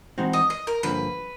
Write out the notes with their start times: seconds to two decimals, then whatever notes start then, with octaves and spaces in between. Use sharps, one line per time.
0.18 E3 G#3 C4 D#4 F#4
0.33 D#5
0.50 D#5
0.67 A#4
0.83 G2 D3 F3 A#3 B4